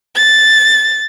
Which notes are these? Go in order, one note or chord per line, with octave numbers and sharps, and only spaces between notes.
A6